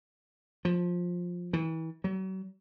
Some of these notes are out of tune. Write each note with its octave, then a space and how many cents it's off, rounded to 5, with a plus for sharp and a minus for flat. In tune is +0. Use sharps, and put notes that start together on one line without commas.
F3 +15
E3 -30
F#3 +40